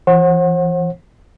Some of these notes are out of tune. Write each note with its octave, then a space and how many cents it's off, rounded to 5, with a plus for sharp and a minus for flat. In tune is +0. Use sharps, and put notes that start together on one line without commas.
E3 +35 C5 +45 F#5 -10